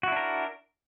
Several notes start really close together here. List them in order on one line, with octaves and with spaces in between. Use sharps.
F#4 E4 D4 A#4